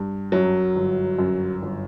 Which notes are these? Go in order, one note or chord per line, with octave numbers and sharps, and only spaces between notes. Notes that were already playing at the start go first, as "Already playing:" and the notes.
Already playing: G2
F#2 F#3
G1
F#2
G1